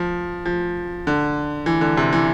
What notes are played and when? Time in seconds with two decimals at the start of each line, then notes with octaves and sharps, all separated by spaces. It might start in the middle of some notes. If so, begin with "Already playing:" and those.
Already playing: F3
0.45 F3
1.07 D3
1.66 E3
1.81 D3
1.97 C3
2.13 E3